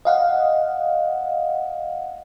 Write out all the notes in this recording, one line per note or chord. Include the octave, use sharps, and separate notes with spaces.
D#5 F5 F#5